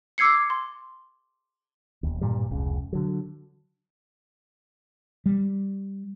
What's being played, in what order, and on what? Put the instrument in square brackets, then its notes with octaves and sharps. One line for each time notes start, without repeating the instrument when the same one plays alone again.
[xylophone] D6 E6 G#6 C7 C#7
C6
[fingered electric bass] E1 D#2
G2 A#2 D#3 G3
F1 C#2 C#3
D3 F#3
[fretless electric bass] G3